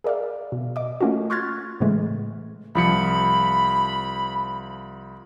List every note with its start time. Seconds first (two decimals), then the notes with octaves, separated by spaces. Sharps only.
0.04 G#4 A#4 D5 E5 F5
0.52 B2
0.76 D#5 D6
1.01 A3 A#3 C#4 F4 F#4
1.30 C6 C#6 F6 F#6 G#6 A6
1.80 A2 C#3 E3 G#3 A3
2.75 C2 F3 B5 C#7